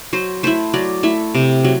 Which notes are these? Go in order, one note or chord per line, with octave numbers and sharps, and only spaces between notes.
F#3 C5
A3 E4 C5
F#3 D5
A3 E4
C3
F#3